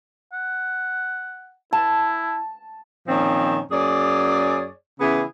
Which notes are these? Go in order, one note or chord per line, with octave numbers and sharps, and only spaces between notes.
F#5
E4 A5
A#2 D#3 F3 C4 C#4
F#2 A#3 G#4 C#5 D5
C#3 E3 B3 E4 G#4